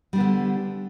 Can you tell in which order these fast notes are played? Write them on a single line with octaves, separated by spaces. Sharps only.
G3 D4 B3 D3